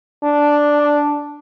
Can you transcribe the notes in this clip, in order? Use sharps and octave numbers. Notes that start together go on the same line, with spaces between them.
D4